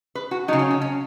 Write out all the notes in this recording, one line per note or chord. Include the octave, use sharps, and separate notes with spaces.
B4
F#4
C#3 F#3 D#4
C#4
C#4
C#4